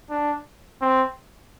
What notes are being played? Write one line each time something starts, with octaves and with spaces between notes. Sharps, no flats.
D4
C4